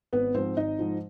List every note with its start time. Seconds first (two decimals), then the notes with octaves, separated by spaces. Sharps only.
0.12 G#1 B3 B4
0.34 G#2 F3 C4 C5
0.57 G#1 D#4 D#5
0.79 G#2 F3